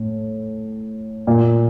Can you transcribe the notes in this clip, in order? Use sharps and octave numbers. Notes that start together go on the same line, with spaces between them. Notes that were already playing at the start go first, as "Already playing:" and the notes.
Already playing: A2
A#2